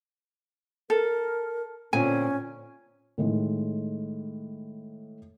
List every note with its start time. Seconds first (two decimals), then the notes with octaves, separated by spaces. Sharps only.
0.90 A4 A#4
1.93 A#2 D3 C4 C#4 G#5
3.18 A2 D#3 G#3